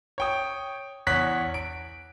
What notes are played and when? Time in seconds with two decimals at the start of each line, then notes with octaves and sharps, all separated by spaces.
0.18 C#5 G5 D#6
1.07 E2 C#5 F#6 B6
1.54 D7